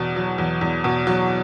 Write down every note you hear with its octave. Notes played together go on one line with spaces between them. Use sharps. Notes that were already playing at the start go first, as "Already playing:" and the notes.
Already playing: E2 B2
F#3
E2
E2
B2
F#3